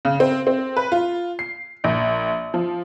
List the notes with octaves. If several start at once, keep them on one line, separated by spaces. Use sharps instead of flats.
C#3
C4
C4
B4
F4
C7
A#1
F3